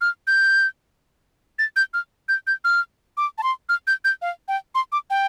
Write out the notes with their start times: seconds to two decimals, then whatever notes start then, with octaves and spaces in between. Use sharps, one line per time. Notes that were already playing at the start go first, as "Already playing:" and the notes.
0.01 F6
0.27 G6
1.59 A6
1.76 G6
1.94 F6
2.29 G6
2.47 G6
2.64 F6
3.17 D6
3.38 A5
3.43 C6
3.69 F6
3.87 G6
4.05 G6
4.22 F5
4.48 G5
4.75 C6
4.92 D6
5.10 G5